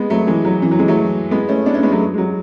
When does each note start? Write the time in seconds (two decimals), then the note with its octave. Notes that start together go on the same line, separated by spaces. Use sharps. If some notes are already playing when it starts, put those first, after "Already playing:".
Already playing: G#3 B3
0.10 F#3 A3
0.27 E3 G#3
0.45 F#3
0.62 E3
0.71 F#3
0.79 E3 G#3
0.88 F#3 A3
1.31 G#3 B3
1.49 A3 C#4
1.66 B3 D4
1.74 A3 C#4
1.83 G#3 B3
1.92 F#3 A3
2.14 G#3
2.18 F#3